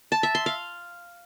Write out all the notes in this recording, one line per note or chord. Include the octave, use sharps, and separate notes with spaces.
A5
E5
C6
F5